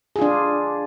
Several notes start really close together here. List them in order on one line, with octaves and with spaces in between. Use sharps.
G#4 F4 D4